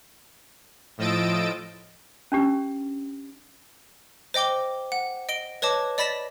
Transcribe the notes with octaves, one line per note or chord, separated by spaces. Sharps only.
A2 F3 D#5 E6 A6 D7
C#4 D4 G4
C5 D#5 G5 D6 G7
F#5
D#5 D7 G7
B4 C#5 D#5 A5 D6
D5 D#5 B5 A6 B6 E7